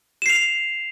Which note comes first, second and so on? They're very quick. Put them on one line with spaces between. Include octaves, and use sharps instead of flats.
E7 C7 F7